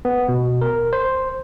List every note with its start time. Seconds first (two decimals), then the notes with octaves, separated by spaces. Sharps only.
0.05 B3
0.29 B2
0.61 A#4
0.93 C5